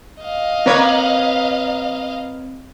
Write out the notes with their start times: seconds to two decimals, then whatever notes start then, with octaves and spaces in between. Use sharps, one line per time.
0.23 D#5 F5
0.66 A#3 C4 B4 C#5